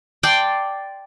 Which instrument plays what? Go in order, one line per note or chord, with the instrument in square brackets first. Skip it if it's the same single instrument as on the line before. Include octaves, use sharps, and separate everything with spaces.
[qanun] D5 G5 A5 C6